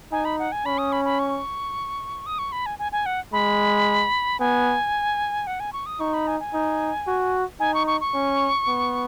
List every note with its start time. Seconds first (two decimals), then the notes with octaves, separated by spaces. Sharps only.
0.12 D#4 G#5
0.25 B5
0.39 F#5
0.52 G#5
0.66 C#4 B5
0.78 D#6
0.92 B5
1.05 B5
1.19 C#6
2.26 D#6
2.39 C#6
2.52 B5
2.66 G#5
2.79 G#5
2.92 G#5
3.06 F#5
3.33 G#3 B5
4.40 B3 G#5
5.47 F#5
5.60 G#5
5.73 C#6
5.86 D#6
6.00 D#4 C#6
6.14 B5
6.27 G#5
6.40 G#5
6.54 D#4
7.07 F#4
7.60 D#4 G#5
7.74 C#6
7.87 C#6
8.01 C#6
8.14 C#4
8.67 B3